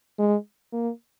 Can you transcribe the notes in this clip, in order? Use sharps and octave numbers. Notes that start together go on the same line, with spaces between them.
G#3
A#3